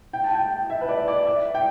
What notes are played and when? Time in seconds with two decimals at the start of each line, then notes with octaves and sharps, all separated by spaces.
0.13 G5
0.24 A5
0.35 G5
0.70 E5
0.81 B4
0.89 D5
1.08 D5
1.26 E5
1.55 G5